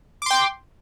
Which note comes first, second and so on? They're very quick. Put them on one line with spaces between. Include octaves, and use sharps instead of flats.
D6 C6 G5